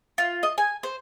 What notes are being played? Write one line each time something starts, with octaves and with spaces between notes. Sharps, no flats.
F4
D#5
G#5
C5